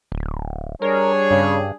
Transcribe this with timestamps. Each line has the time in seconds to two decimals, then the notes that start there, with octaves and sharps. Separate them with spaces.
0.12 D1
0.82 G3 D4 G#4 A#4 C#5
1.31 G2 C#3